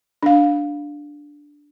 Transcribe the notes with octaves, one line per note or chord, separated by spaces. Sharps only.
D4 F5